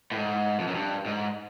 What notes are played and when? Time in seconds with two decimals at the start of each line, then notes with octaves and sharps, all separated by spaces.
0.12 A2
0.16 G#2
0.59 F2
0.67 F#2
0.75 G2
1.06 G#2